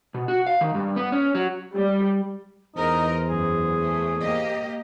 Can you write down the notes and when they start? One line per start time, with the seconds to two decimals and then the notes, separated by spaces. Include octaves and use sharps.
0.14 B2
0.28 F#4
0.47 F5
0.61 D#3
0.74 G2
0.96 B3
1.12 C#4
1.35 F#3
1.75 G3
2.76 E2 D#4 A#4 C5 D#5
3.28 F#2 G#4
3.81 A3
4.21 A#3 G4 D#5